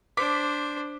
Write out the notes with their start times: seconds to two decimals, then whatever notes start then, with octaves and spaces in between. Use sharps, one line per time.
0.17 D4 C5 D6 B6